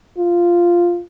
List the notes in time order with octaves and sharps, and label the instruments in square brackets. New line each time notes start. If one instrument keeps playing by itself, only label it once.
[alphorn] F4